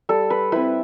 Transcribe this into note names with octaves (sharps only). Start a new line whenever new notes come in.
G3 A4
B4
C4 E4 B4